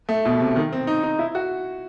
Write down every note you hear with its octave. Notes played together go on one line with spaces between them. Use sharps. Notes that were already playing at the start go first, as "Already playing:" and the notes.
A3
B2
C3
D#3
C4
D#4
D#4
E4
F#4